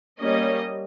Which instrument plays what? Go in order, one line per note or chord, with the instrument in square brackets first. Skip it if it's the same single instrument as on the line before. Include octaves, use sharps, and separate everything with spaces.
[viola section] G3 A#3 C#4 D#5